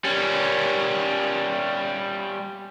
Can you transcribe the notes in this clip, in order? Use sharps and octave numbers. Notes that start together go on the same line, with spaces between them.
G3 C#4